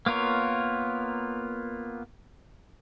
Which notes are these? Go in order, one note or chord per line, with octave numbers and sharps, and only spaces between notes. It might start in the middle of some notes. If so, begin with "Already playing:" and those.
A#3 B3 F4 A#4 C#5